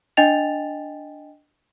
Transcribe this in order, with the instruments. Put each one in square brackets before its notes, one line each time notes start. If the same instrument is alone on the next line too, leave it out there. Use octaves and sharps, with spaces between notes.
[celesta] D4 D#5 G5 G#5 A6 F7